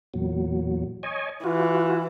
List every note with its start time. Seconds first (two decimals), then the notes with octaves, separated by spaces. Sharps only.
0.14 E2 A#2 F#3
1.03 C#5 D#5 G#5
1.44 E3 F4 F#4